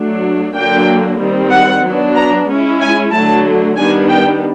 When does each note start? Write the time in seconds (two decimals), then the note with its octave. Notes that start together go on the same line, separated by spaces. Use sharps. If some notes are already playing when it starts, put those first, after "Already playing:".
Already playing: F#3 A3 D4
0.55 D3 F#3 A#3 D4 G5
1.19 D#3 G3 C4
1.51 F#5
1.84 F#3 B3 D4
2.16 A#5
2.48 G#3 C#4 E4
2.81 G#5
3.12 D3 F#3 A3 A5
3.76 D#3 G3 B3 D4 G#5
4.08 G5